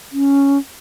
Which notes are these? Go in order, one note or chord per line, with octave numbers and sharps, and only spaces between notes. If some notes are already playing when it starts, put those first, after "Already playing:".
C#4